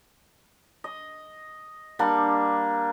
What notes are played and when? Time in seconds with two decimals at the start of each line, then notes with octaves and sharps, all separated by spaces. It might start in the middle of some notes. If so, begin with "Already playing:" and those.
0.84 D#5
1.99 G3 A#3 D4